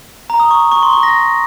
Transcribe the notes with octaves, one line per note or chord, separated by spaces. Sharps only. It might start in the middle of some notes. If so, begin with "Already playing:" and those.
A#5
D#6
C#6
C#6
C6
C#6
A#6